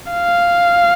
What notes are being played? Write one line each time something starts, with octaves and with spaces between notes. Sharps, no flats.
F5